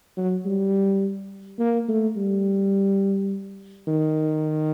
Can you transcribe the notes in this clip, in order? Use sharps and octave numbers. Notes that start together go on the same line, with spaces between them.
F#3
G3
A#3
A3
G3
D#3